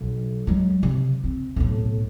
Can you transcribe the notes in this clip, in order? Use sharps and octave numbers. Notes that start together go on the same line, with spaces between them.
B1
F#3 G#3
C3
C4
B1 A2